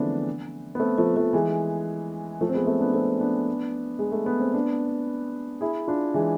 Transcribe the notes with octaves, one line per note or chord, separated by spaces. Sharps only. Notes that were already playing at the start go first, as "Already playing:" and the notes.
Already playing: D3 E3 F3 G#3 A3 B3 C4 D4
B3
A3 C4
F3 A3
F3 A3
E3 G#3
F3 A3
C4
G#3 B3
A3 C4
B3 D4
A3 C4
B3 D4
G#3
A3
B3
C4
B3 D4
E4 G#4
D4 F4
E3 G#3